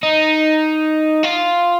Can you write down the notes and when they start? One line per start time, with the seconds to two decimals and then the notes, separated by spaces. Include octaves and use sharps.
0.03 D#4
1.24 F4